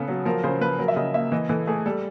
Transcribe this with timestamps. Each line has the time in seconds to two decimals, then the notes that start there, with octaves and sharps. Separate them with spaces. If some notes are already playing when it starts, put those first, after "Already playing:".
Already playing: C#3 B3 A4
0.08 F#3
0.25 F3 A#4
0.44 C#3 C5
0.61 F3 B4
0.79 F#3 A#4
0.88 E5
0.96 C#3 D#5
1.14 A#3 E5
1.32 E3 D#5
1.49 E3 A4
1.67 A3 G#4
1.86 G3 A4